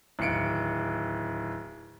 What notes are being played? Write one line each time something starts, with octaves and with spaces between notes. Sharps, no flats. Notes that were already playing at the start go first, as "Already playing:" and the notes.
D1 D#2 C#7 D7